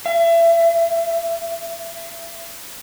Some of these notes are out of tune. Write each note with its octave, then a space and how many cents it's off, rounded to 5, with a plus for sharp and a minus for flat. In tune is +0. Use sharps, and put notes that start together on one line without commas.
E5 +35